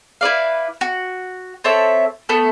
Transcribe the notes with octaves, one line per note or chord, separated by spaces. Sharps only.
E4 B4 D5 F5
F#4
C4 A4 C#5 E5
A3 B3 A4